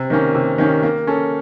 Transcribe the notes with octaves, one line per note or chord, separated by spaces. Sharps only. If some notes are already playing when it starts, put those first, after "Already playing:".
Already playing: C3
D#3 A#3 C#4
C3
D#3 A#3 C#4
A#3
C#4 A4